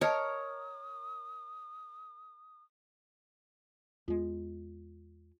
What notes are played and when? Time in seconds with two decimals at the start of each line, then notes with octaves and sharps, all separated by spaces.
0.01 A#4 C#5 D#5 A5 D#6
4.08 E2 G#3 F4